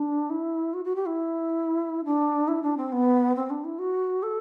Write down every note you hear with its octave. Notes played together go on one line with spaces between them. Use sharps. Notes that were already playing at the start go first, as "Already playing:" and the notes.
Already playing: D4
E4
F#4
F#4
G4
E4
D4
E4
D4
C4
B3
C4
D4
E4
F#4
A4